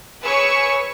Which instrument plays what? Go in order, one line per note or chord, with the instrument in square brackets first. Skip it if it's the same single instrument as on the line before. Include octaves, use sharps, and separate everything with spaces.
[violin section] G#4 B4 C#5 C#6 E6